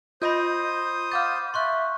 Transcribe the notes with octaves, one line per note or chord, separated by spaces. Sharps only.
F4 C5 D#5 B5 D#6 G6 A#6
F5 F#5 D6 F6 G6 A6
E5 C6 C#6 F#6